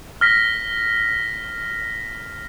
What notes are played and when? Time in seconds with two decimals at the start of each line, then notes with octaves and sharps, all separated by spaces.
0.21 F6 A#6 B6